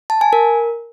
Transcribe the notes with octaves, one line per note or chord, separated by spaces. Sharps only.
A5
G#5
A#4